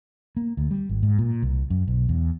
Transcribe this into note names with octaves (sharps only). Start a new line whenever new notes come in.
A#3
D2
G3
G#1
G#2
A#2
C2
F#2
B1
E2